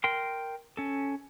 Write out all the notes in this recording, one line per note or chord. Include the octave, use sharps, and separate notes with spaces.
A#4 G5 C6
C#4 A4